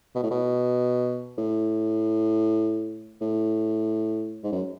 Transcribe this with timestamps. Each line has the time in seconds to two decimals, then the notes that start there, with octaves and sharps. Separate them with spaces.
0.15 B2
0.23 A2
0.31 B2
1.38 A2
3.21 A2
4.44 G#2
4.52 F#2